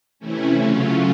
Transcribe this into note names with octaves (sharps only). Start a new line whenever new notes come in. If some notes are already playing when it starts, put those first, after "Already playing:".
C3 E3 A3 C#4 E4
C#3 F#3 A3 C#4 F4